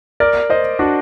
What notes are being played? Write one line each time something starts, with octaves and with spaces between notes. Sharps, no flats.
A#4 D5
C5 D#5
D4 F#4